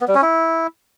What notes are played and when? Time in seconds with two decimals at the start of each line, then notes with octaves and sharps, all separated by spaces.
0.01 B3
0.08 G3
0.15 C#4
0.22 E4